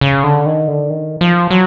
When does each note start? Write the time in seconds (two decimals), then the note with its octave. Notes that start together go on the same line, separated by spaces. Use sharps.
0.01 C#3
0.23 D3
0.46 D#3
0.68 D3
0.90 D#3
1.21 F3
1.50 F#3